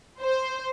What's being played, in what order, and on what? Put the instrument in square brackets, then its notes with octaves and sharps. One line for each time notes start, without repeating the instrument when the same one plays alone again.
[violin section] C5